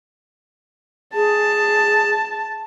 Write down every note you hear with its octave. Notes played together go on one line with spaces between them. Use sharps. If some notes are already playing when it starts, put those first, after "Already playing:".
G#4 A5